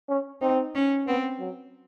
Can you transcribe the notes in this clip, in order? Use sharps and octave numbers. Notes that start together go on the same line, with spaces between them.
C#4
C4 D#4
C#4
B3 C4
F#3